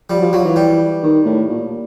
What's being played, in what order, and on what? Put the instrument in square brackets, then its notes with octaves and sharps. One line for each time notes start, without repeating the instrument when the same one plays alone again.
[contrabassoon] F3 [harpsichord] G3
[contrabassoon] F#3
F3
[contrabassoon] F3 [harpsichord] F#3
[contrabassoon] E3
[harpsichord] G3
[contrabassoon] D#3
A2
A#2